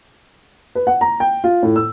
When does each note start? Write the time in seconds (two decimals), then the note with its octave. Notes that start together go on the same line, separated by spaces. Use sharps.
0.75 B4
0.87 F#5
1.01 A#5
1.20 G5
1.44 F4
1.63 A2
1.76 E6